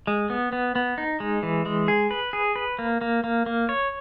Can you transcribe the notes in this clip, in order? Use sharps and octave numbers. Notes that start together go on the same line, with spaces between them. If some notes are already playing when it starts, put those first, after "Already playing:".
G#3
B3
B3
B3
D#4
G#3
E3
G#3
G#4
B4
G#4
B4
A#3
A#3
A#3
A#3
C#5